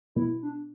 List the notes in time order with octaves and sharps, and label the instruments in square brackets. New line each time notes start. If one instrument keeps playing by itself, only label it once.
[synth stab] B2 [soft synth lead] E4
[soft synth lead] D4